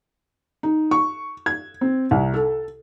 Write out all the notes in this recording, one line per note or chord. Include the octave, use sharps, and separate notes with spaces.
D#4
C#6
G#6
C4
C2
A4